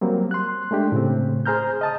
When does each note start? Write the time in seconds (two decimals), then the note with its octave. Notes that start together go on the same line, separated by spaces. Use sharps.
0.01 F#3 G3 A#3 C4
0.31 C6 F#6
0.71 G#3 A3 D4 G4
0.92 A2 C#3 C4
1.46 G#4 C5 A#5 F6 G6
1.81 D#5 A5 D#6